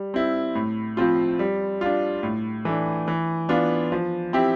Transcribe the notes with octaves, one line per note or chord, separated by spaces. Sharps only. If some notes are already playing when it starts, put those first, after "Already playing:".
Already playing: G3
C4 E4
A2
F3 C4 F4
G3
D4 F4
A2
E3 A3 D4
E3
B3 D4 F4
F3
C4 E4 G4